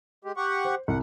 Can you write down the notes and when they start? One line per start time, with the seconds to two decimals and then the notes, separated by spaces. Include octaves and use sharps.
0.25 G#3 G4
0.37 G4 F#5 C#6
0.65 C5
0.88 C2 F#5